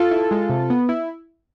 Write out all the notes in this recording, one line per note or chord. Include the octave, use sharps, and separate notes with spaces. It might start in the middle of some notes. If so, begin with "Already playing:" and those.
Already playing: F4 A4
E4
G#3
C3
B3
E4